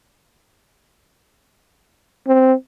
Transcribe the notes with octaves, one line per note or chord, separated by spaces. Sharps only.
C4